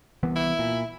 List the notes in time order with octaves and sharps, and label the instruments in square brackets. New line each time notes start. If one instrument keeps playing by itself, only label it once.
[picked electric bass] C2 E3 B3
[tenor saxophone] E4
[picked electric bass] A#2